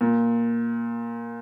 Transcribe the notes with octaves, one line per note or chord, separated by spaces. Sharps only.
A#2